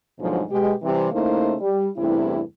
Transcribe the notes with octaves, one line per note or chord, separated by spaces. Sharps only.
D2 G#2 B2 D3 F3 F#3
B2 G#3 G4
C3 E3 G3
C#3 A3 A#3 D#4 E4 C5
G3
E2 G2 C3 A3 E4